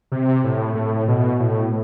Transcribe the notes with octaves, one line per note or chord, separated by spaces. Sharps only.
C3
A2
A2
B2
A2